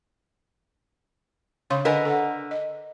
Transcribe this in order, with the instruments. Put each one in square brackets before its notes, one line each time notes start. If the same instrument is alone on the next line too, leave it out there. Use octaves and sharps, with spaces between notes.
[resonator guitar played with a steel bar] C#3 [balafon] C#5 C6
[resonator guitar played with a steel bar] D3 A#4 B4 [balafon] D#5 G#5
[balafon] A4 F#5
D#5